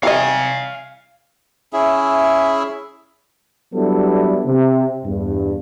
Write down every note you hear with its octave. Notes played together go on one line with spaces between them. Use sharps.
E3 G3 D#5 F5 G#5
C#4 E4 G#4 E5
F#3 G3 B3 D4 E4 A4
C3
E2 G2